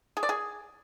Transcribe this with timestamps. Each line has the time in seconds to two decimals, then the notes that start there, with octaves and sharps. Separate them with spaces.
0.17 G#4
0.23 D5
0.29 G#4